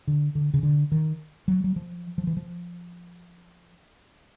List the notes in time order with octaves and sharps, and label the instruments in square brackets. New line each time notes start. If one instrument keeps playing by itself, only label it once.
[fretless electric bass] D3
D3
C#3
D3
D#3
F#3
F#3
F3
F3
E3
F3